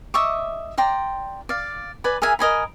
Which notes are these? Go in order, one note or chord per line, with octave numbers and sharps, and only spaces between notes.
D#5 E5 C#6 D6
D5 G5 A#5 C6
D5 F5
B4 D5 G#5 B5
G#4 A#4 E5 G#5
A#4 D#5 G#5 B5